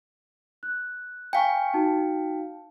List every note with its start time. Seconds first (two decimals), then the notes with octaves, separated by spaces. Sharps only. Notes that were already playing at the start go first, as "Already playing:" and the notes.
0.63 F#6
1.33 F5 G5 G#5 A#5 C#6
1.73 D#4 F#4 A5